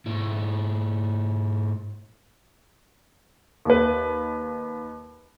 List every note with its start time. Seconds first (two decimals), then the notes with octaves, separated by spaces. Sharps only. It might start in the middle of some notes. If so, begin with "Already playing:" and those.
0.06 G#2 E4
3.65 D#2 B4